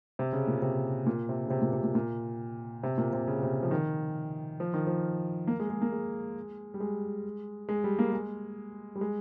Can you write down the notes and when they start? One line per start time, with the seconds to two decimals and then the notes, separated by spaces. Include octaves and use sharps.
0.19 C3
0.33 C#3
0.47 A#2
0.62 C3
1.06 A#2
1.29 C3
1.45 C#3
1.50 C3
1.62 A#2
1.73 C3
1.83 A#2
1.95 A#2
2.83 C3
2.98 A#2
3.13 C3
3.28 C#3
3.43 C3
3.63 F3
3.71 D#3
4.60 F3
4.74 D#3
4.87 F3
5.47 A#3
5.60 G#3
5.70 G#3
5.82 A#3
5.92 G#3
6.74 G3
6.80 G#3
7.69 G#3
7.84 G3
7.99 A#3
8.12 G#3
8.96 G3
9.01 G#3